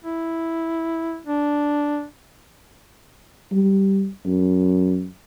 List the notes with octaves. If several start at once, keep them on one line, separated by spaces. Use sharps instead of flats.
E4
D4
G3
F#2